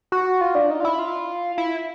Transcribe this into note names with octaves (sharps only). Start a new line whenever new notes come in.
F#4
F4
D4
D#4
F4
E4
F4
E4